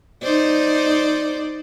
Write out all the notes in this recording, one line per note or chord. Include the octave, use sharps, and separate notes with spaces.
D#4 C5 D5